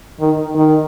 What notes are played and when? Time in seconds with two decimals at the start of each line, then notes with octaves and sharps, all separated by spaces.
0.20 D#3
0.54 D#3